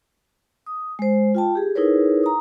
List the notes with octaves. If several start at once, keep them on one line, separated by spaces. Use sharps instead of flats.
D#6
G#3 C5
F4 G5 A5
G4 G#4
D#4 E4 G#4 A#4 B4 C#5
A#5 D#6